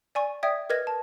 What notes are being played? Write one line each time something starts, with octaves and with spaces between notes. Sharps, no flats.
D5 G#5 C#6
D5 E5 G5 D#6 G#6
A#4 B4 D#5 G#6 A#6
A5